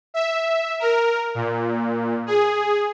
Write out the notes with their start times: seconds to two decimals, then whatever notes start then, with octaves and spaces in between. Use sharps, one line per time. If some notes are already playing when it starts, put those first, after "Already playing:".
0.14 E5
0.80 A#4
1.35 A#2
2.26 G#4